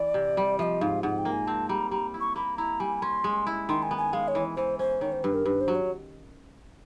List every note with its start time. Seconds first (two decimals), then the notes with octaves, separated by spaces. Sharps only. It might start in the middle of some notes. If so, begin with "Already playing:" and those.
Already playing: E3 D5
0.14 C3
0.37 G3
0.58 F3 D#5 E5
0.81 G#2 F5
1.03 G#2 F#5
1.18 G5
1.25 A#3
1.32 G#5
1.47 C4 A5
1.69 G3 A#5
1.91 G3 A#5
2.14 E4
2.20 C#6
2.36 A#3 B5
2.58 E4 A#5
2.80 G3 G#5
3.02 C#4 C6
3.24 G#3
3.47 E4
3.69 D#3 C6
3.83 G#5
3.91 B3
3.97 G#5
4.13 G#3 F5
4.28 C#5
4.35 E3
4.56 E3 C5
4.79 C#4 C5
5.01 D#3 C#5
5.12 C5
5.24 G2 B4
5.34 A#4
5.46 G2 B4
5.61 C5
5.68 F#3
5.75 C#5